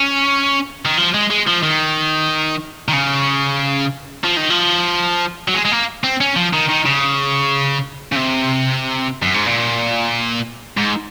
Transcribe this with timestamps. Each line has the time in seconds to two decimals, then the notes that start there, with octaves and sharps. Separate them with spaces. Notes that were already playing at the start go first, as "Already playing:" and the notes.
Already playing: C#4
0.86 D#3
0.97 F3
1.14 G#3
1.30 G#3
1.47 F3
1.63 D#3
2.88 D#3
2.93 C#3
4.24 F3
4.37 D#3
4.50 F3
5.48 F#3
5.54 G#3
5.65 G#3
5.72 A#3
6.04 C4
6.21 C#4
6.36 F3
6.53 D#3
6.69 D#3
6.86 C#3
8.12 C#3
8.16 C3
9.22 F#2
9.34 G#2
9.47 A#2
10.77 G#2